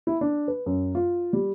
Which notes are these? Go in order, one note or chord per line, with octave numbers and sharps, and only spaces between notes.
E4
D4
B4
F#2
F4
G3